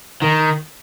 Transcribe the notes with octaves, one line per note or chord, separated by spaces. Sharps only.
D#3